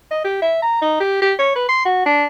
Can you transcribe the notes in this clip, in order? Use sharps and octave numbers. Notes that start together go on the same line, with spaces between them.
D#5
G4
E5
A#5
D#4
G4
G4
C#5
B4
C6
F#4
D4